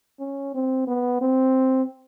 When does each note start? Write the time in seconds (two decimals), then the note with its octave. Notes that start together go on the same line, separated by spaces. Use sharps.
0.20 C#4
0.54 C4
0.87 B3
1.21 C4